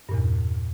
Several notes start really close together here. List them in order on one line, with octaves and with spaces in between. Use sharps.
G2 A#2 E2